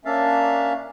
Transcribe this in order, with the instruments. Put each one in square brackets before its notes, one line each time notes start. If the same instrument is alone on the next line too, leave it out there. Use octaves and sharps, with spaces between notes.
[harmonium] A#3 C#4 D4 E5 F5 A5